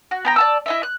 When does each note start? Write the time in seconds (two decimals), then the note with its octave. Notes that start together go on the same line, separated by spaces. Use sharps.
0.11 F#4
0.25 B3 G5 A#5
0.36 D5 A5 E6
0.66 E4 D#5 E5
0.83 F#6